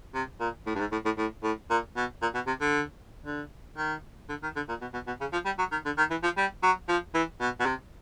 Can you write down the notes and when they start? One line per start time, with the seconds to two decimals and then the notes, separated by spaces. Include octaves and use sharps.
0.15 C3
0.40 A#2
0.67 A2
0.75 G2
0.80 G#2
0.92 A2
1.05 A2
1.18 A2
1.43 A2
1.70 A#2
1.97 B2
2.22 A#2
2.34 B2
2.47 C3
2.61 D3
3.26 D3
3.78 D#3
4.29 D3
4.43 D#3
4.56 D3
4.69 A#2
4.81 B2
4.93 B2
5.07 B2
5.21 C#3
5.33 F3
5.45 G3
5.58 F#3
5.72 D#3
5.85 D3
5.98 D#3
6.11 E3
6.23 F3
6.37 G3
6.63 F#3
6.89 F3
7.14 E3
7.41 B2
7.60 B2
7.66 C3